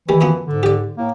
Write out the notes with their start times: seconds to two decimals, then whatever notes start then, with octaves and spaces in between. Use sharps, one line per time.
0.09 D#3 E3 G3
0.21 F#2 F3 B3
0.47 G#2 D3
0.63 G4 D5
0.97 A2 A#3